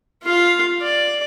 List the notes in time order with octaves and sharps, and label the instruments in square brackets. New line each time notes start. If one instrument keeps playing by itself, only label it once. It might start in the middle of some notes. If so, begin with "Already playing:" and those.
[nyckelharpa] F4 F5
D5